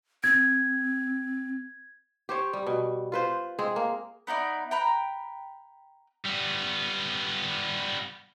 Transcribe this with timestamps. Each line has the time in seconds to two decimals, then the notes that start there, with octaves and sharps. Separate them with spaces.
0.24 C4 G#6
2.29 G4 C5 C#5
2.53 G3
2.67 B2
3.12 F4 B4 C5
3.59 G#3 C4 G#4
3.76 A#3
4.27 B3 D#4 E4 D5
4.71 G5 A#5 B5 F#6
6.25 G3 B3